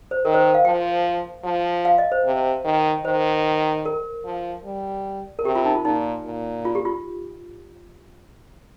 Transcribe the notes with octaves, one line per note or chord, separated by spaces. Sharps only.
C5
D#3 A#4
C5
C5
F5
F3 G5
F3
F5
D#5
C5
C3
D#3
D#3 C5
A#4
F3
G3
A#4
C3 G4
F4
D#4
F4
A#2 D#4
A#2
F4
G4
F4